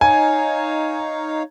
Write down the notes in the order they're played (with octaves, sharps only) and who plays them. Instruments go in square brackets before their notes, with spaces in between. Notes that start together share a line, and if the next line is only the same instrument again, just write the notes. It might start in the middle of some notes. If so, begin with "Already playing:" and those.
[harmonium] D#4 C#5 F5 [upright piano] G#5